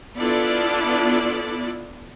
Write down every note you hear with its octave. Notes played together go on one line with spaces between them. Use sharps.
B3 D4 E4 F4 A4 D5